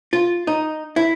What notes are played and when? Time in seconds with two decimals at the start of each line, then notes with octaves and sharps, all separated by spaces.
0.13 F4
0.47 D#4
0.96 E4